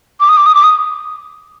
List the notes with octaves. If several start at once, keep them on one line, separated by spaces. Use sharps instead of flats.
D6
D#6
D6
D#6
D6
D#6